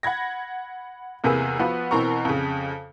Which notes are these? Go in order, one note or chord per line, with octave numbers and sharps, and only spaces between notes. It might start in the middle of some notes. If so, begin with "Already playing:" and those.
F#5 B5 G#6 A#6
E2 C3 A#3 G#4 B4 E6
F3 B3 F4 F#4 B4
B2 E3 C4 A#4 A#5 C#6
F2 C#3